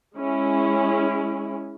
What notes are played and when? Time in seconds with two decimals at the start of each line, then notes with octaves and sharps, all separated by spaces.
0.18 G#3 C#4 E4